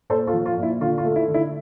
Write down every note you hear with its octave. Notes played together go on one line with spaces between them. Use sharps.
A#2 A4 C5
F4 A4
F3
F4
A#2
E4
D3 F4
F4
A3
E4
D3
E4